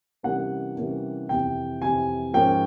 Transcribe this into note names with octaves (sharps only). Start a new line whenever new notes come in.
C3 E3 G3 A#3 C#4 F#5
C3 E3 G3 A#3 C#4
F2 C3 E3 G5
F2 C3 E3 G#5
G#2 F3 A#3 C#4 G5